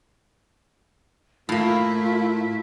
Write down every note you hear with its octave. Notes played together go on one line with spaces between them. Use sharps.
A2 A3 A#3 E4 F4